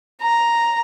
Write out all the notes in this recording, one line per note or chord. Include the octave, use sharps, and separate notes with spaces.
A#5